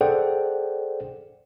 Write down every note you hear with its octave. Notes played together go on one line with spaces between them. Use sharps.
G#4 A4 C5 D5 F#5 G5